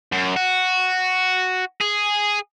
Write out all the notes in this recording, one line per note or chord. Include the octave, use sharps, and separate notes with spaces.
F#2
F#4
G#4